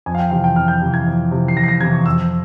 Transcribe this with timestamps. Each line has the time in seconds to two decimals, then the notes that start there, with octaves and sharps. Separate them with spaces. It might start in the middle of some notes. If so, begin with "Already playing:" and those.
0.06 F2 G#5
0.15 F5
0.19 G5
0.31 C3 E3 F5
0.44 G5
0.56 F2 F6
0.68 G6
0.81 C3 E3
0.94 G#6
1.06 F2
1.31 C3 E3
1.48 C7
1.56 F2 A#6
1.64 C7
1.68 A#6
1.81 C3 E3 G#6
1.93 C#6
2.06 F2 E6